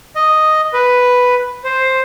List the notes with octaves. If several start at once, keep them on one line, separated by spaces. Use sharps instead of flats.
D#5
B4
C5